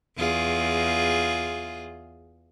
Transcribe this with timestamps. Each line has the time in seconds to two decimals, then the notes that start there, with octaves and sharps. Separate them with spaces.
0.17 E2 F4 G#4